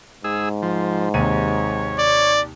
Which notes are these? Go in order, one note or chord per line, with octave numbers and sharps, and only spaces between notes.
G#2 G#4 E6
F3
D#2 C3 C#5 D#7
D5